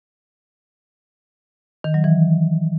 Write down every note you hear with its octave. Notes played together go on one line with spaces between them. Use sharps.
D#3
F#3
E3